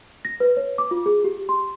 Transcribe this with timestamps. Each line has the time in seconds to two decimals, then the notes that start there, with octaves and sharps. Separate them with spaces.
0.25 A#6
0.40 B4
0.57 C#5
0.78 D6
0.91 F4
1.06 G#4
1.24 G4
1.49 C6